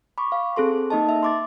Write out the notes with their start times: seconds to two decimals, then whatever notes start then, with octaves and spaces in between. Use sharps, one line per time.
0.18 B5 C#6 D6
0.32 F5
0.56 C4 G#4 A4 C6
0.90 A#3 D#4 D#5 A5
1.09 E5
1.23 C6 D6 A6